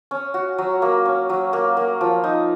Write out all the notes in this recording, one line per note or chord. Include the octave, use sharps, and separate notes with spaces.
C#4
F#4
F#3
A#3
C#4
F#3
A#3
A#3
F3
D#4